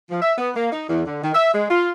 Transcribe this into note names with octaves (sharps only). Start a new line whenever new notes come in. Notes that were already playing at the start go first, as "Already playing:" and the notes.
F3
E5
B3
A#3
D#4
E2
D3
D#3
E5
G#3
F4